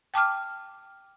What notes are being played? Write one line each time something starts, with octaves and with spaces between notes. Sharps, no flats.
G5 A5 D6 F6